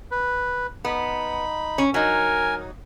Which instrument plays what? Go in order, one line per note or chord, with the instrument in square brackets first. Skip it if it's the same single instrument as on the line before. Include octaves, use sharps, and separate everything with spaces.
[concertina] B4
[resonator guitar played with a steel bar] B3 [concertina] D#4 B5
[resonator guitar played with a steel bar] C#4
[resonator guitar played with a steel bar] F#3 D#4 [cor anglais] A#4 [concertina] G#5